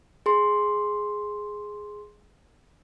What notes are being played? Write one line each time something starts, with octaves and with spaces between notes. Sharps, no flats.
G#4 C6